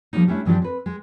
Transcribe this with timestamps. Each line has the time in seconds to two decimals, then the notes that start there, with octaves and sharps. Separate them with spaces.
0.13 F3 G3 A3 A#3 D#4
0.27 G3 A3 C#4 D4 E4
0.45 G2 E3 F3 B3 D4 G4
0.62 C4 B4
0.86 G#3